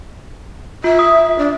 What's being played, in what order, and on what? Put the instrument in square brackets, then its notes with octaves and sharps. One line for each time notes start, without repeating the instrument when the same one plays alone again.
[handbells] F4 [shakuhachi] E5
[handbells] D#6
[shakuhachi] D4